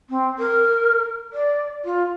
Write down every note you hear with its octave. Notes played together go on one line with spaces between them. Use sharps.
C4
A#4
D5
F4